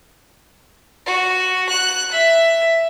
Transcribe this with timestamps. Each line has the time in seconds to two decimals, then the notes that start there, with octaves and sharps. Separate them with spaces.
1.06 F#4
1.69 F#6
2.12 E5